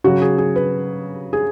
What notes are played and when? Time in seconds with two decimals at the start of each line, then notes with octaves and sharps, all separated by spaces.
0.04 C#3 F#3 F#4
0.22 G#4
0.38 G#4
0.56 B4
1.33 G#4